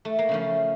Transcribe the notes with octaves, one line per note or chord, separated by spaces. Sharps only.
A3
A#3
C#3 F3 A3 C#4